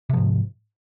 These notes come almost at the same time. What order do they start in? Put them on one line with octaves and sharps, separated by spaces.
C3 F3 G#2